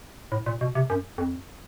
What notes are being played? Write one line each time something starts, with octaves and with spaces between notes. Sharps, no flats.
A2
A#2
B2
C3
F#2
F2